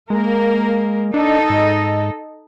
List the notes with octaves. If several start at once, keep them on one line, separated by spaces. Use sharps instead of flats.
G#3 A#3 A#4
D4 D#4 A4 D#5
G#2